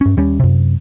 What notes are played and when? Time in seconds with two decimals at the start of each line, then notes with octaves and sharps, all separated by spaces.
0.01 G2 C#4
0.17 D#2 G3 C#4
0.39 F#2 C3